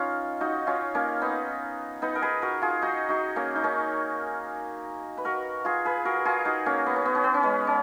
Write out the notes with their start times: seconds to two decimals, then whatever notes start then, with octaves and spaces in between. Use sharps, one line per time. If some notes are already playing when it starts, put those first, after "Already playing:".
Already playing: C#4 D#4 F4
0.40 D#4 F#4
0.67 C#4 F4
0.95 A#3 C#4
1.21 B3 D#4
2.02 B3 D#4
2.15 A#4
2.22 G#4 B4
2.42 F#4 A#4
2.62 F4 G#4
2.82 D#4 F#4
3.09 D#4 F#4
3.36 A#3 C#4
3.55 D#4
3.64 A#3 C#4
5.17 B4
5.25 F#4 A#4
5.65 F4 G#4
5.85 G#4 B4
6.05 F#4 A#4
6.25 F4 G#4
6.45 D#4 F#4
6.66 A#3 C#4
6.86 B3
6.96 C#4
7.05 B3
7.15 C#4
7.24 B3
7.34 C#4
7.43 G#3 B3
7.67 C#4